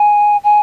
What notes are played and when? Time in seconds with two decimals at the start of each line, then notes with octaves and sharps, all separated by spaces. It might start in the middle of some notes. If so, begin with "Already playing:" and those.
Already playing: G#5
0.44 G#5